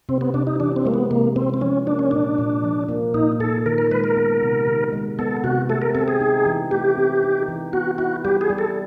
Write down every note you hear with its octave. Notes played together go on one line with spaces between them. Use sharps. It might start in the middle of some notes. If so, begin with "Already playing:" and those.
C3 C4
B3
C3 D4
D#4
E3 D4
C4
G#3 A#3
B3
C3 A#3
C3 C4
C4
F3 C#4
A#3 D4
C#4
A#2 D4
A#2
F3
A#3
A#2 D#4
A#2 A4
D#3 A#4
A#4
G#3 B4
A#4
B3
C3
D#3
G#3
B3 A4
C3 F#4
A3 A4
A#4
C4 A4
G#4
D#4
E3
A3 G4
C4
D#4
E3
B3 F#4
E4 F#4
G3 G4
G#4
G3
A4